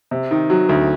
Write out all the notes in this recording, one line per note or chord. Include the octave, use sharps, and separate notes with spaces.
C3
D#3
F#3
D2